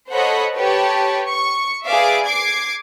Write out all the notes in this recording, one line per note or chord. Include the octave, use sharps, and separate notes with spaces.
A4 C5 C#5 D#5 F#5 B5
G4 B4 C#5 A5
C#6
G#4 B4 D5 E5 F5 D6
D6 G#6 C7